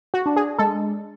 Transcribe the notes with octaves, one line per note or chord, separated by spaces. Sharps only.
F#4
D4
G#4
G#3 A4